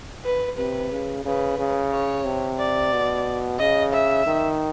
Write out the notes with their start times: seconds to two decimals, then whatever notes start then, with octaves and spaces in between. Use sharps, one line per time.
0.25 B4
0.57 C3 B4
0.92 C#3
1.25 C#3 B4
1.58 C#3
1.92 C#5
2.26 C3
2.59 D5
2.93 B2
3.59 C#3 D#5
3.93 E5
4.26 D#3